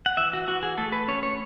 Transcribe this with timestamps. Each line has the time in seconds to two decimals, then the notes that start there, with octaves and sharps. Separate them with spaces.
0.06 F#5
0.17 E3 E5
0.33 F#4
0.48 E3 F#4
0.63 G#4
0.78 A3 A4
0.92 B4
1.08 C#4 C#5
1.23 C#5